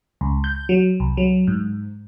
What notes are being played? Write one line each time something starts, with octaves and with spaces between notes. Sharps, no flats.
C#2
G6
F#3
C2
F#3
G#2